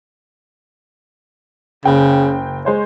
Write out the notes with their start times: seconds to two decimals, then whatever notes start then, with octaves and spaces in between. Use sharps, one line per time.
1.85 F#1 C#3 G5
2.65 G#3 C5 C#5